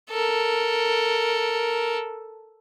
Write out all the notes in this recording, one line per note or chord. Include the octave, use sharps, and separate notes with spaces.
A4 A#4